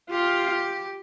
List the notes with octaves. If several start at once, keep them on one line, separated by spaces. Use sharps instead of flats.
F4 G4